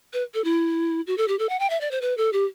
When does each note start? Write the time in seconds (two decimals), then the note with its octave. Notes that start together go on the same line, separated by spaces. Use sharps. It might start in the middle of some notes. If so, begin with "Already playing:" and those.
0.13 B4
0.34 A4
0.44 E4
1.07 F#4
1.18 A4
1.28 G4
1.39 A4
1.49 F#5
1.60 G5
1.70 E5
1.81 D5
1.91 C5
2.02 B4
2.18 A4
2.33 G4